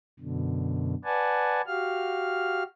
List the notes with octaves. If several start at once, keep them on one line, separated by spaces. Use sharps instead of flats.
F#2 B2 D3
B4 D5 F#5 G#5 A5
F#4 G4 F5 F6